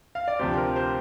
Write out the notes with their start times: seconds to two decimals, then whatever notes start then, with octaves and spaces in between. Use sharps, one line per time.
0.15 F5
0.28 D5
0.39 D2 C3 F3 G4 C5
0.57 A#4
0.76 G4 C5